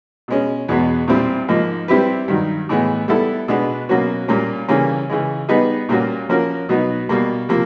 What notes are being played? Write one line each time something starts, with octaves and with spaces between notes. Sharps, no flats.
B2 G#3 C#4
E2 B2 G#3 B3
A#2 G3 C4 E4
G#2 F3 A#3 D#4
G3 C4 E4 G4 B4
G2 D#3 F#3
A2 E3 G#3 B3
G3 B3 E4 A4
B2 G#3 B3 D4
B2 F#3 A#3 C#4 F#4
A#2 G3 A#3 C#4
C#3 E3 G3 A#3 C#4
C#3 E3 G#3
G3 B3 D#4 G#4 B4
A#2 G3 A#3 C#4 F#4
F3 A#3 C#4 F#4 A#4
B2 F#3 B3 D#4
B2 G3 A#3
C3 F3 A#3